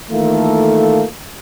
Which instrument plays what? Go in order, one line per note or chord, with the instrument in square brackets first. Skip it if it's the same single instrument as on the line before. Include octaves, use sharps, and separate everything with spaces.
[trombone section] D#3 E3 A3 A#3 F4 A4